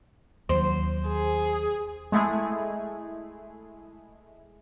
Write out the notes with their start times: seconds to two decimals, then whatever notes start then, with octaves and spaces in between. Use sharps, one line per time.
0.49 D#2 F#3 C5
1.08 G#4
2.12 G#3 A3 E4 G#4